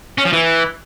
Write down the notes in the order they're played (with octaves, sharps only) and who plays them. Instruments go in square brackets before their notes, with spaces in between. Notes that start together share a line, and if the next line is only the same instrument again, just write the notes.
[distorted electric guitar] C#4
F3
E3